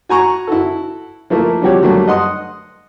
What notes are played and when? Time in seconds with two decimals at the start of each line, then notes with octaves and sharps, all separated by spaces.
0.09 F#4 G#5 A#5 C#6
0.47 E4 F#4 A4
1.30 F3 A3 A#3 E4 A#4
1.62 F3 G3 C4 F#4 G4 C#5
1.82 D3 F#3 G3 A3 A#3
2.08 D#5 F#5 C6 D#6